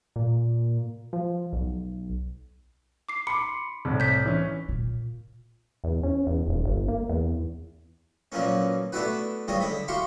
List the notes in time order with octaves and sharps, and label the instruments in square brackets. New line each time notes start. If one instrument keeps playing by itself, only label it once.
[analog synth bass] A#2
F3
B1
[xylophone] D6 C7
[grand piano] B5 C6 D6 [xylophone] C#7
[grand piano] C2 A2
[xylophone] G6 B6
[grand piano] E3 C#4
[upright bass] A#2
[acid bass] E2
C#4
E2
D#1
G1
A#3
E2
[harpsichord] A#2 F3 F#3 A#3 B3 C#4
A3 B3 D4 E4 F#4 B4
C#2 G2 G3 C4 C#5 D#5
D3 D#5 B5
E4 F#4 G4 F5 C6 C#6